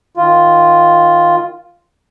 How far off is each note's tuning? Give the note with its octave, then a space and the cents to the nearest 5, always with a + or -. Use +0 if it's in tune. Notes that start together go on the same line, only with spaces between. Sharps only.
D#3 +0 F4 +0